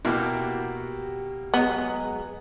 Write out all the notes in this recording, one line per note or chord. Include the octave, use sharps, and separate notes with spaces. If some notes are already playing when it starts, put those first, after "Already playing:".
B2 A#3 E4 F#4 G4 F#5
F#3 G#3 B3